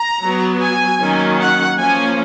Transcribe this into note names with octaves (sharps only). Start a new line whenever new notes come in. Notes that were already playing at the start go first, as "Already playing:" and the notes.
Already playing: A#5
F#3 B3
G#5
D#3 F#3 A#3 C#4
F#5
F3 A#3 C#4 G#5